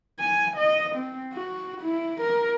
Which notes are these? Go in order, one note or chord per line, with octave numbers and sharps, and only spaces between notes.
G#5
D#5
C4
F#4
E4
A#4